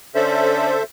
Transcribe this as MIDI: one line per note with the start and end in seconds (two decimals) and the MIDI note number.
0.15 0.75 50
0.15 0.75 61
0.15 0.75 62
0.15 0.83 69
0.15 0.83 72
0.15 0.83 76